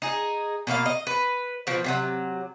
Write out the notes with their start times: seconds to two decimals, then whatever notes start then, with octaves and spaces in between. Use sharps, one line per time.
0.02 D#4 G#4
0.67 B2 A#3 F#4 F5
0.86 D#5
1.07 B4
1.67 B2 F3
1.84 C3 D#3 F#3